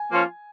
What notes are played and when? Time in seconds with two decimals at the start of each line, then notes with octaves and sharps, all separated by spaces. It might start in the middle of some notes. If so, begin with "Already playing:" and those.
Already playing: G#5
0.11 F3 A#3 C#4 F4